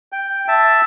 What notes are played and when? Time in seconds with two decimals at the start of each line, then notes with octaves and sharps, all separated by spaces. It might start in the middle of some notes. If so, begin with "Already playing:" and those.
0.12 G5
0.48 E5 A5